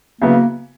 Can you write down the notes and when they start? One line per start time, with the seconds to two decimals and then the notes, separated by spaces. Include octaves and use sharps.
0.21 C#3 F#3 A#3 B3 E4